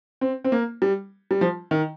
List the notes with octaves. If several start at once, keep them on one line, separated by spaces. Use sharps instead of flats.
C4
C4
A#3
G3
G3
F3
D#3